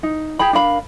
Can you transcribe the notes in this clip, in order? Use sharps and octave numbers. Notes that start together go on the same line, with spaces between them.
D#4
G4 G#4 G5 B5
D4 A#4 F5 B5